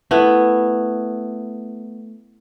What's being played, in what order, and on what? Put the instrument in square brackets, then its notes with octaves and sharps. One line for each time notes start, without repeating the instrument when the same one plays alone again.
[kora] A3 B3 E4